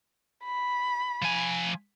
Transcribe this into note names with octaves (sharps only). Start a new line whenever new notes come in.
B5
F3 G#5